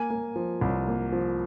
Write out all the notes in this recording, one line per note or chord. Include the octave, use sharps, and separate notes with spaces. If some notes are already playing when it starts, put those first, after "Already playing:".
Already playing: A#3 G#5
A#3
F3
C2
A#3
F3